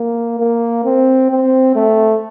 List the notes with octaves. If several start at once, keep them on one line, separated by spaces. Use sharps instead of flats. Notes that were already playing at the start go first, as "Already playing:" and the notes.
Already playing: A#3
A#3
C4
C4
A3